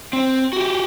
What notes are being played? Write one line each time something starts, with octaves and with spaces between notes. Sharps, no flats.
C4
F#4 G4